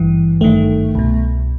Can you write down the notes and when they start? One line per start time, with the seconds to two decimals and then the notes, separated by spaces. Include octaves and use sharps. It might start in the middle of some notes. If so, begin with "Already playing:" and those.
Already playing: G#1 G2 E3
0.41 G#1 G2 D#3 A3
0.95 C2 B2